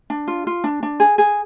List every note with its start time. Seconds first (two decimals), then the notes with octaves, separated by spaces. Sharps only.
0.10 D4
0.28 F4
0.47 F4
0.64 D4
0.83 D4
1.00 G#4
1.18 G#4